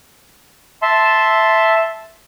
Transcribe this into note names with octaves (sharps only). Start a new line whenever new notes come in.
E5 A5 C6